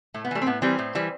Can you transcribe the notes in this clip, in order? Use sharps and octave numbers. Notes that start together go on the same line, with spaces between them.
A2 A3
B3
E3 G3 A3
C4
A2 B3
E3 G3 C4
A2
E3 G3